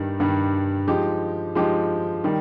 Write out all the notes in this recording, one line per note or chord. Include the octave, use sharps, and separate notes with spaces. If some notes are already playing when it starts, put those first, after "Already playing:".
Already playing: G2 D#3 G3
G2 D#3 G3
F3 G#3 D#4 G4
F3 G#3 D#4 G4
D#3 G3